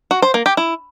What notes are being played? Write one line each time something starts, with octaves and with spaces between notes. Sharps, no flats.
F#4
C5
A#3
G4
E4